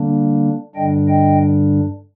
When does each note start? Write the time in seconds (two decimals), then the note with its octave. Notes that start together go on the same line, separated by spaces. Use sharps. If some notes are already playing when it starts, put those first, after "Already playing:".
Already playing: D3 G3 A#3 D4
0.75 G2 D3 G3 D4 D#5 G5
1.08 D#5 G5